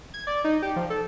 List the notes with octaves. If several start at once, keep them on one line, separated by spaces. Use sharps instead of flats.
G#6
D5
D#4
G4
F3
A4